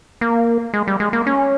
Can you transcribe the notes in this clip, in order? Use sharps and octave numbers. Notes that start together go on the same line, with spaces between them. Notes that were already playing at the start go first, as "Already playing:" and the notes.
A#3
G#3
G3
G#3
A#3
C#4